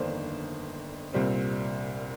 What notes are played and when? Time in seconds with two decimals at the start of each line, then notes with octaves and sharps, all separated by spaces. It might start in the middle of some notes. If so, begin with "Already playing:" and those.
Already playing: G1 F2 D#3 A#3 D4 C5
1.13 C2 A#2 G3 C4